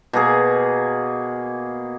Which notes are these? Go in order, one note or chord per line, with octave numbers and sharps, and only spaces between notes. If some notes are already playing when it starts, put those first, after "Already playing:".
B2 A#3 G#4